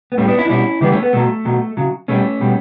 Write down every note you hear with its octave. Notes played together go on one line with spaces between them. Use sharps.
B3
A2 G3 A3 C#4
B3 D4
C#4 E4
D4
B2 G3 C#4 E4
C#3 E3 G3 B3 D4
A3 C#4
B3
B2 F#3 A3
B2 F#3
C#3 F#3
B2 G3 A3 C#4
B2 G3